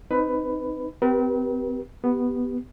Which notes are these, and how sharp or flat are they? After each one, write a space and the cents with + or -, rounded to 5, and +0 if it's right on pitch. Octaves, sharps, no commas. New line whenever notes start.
C4 +0 D#4 +0 B4 +15
C4 -35 G4 -15 B4 -40
B3 +0 G4 +0